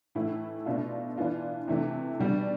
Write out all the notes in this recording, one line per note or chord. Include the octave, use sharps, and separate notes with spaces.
A2 E3 A3 E4
B2 A3 D4 F4
E3 B3 D4 F4
C3 E3 A3
B2 G3 D4